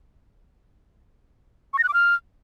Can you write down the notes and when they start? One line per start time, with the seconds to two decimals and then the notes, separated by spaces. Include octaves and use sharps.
1.73 C#6
1.79 A#6
1.84 F#6
1.89 D6
1.94 F6